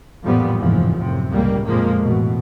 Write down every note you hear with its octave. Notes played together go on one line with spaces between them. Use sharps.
A1 F2 A#2 F3 G3 B3
F1 D#2 G#2 E3 F3
F#2 A2 C3
G1 C#2 G3 A#3
F2 A#2 F3 G#3 A#3
A1 B2